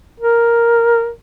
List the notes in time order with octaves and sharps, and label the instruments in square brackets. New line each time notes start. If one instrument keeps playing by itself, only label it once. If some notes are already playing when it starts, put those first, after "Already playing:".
[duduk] A#4